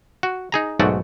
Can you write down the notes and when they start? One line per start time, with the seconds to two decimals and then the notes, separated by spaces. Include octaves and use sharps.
0.23 F#4
0.52 D#4 G#4 A#5
0.79 B1 G#2 A3 F#4 D5